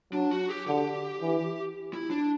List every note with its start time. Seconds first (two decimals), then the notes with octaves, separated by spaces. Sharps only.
0.13 F#3 D4
0.31 F#4
0.48 G4
0.67 D3 G4
1.21 E3
1.93 E4
2.10 D4